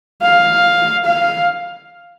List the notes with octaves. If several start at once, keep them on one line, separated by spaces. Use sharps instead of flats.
F5
F5